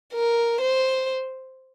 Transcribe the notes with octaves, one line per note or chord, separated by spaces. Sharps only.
A#4
C5